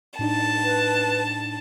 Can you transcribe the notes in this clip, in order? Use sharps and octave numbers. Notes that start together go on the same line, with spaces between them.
A2 D4 D#4 A5
B4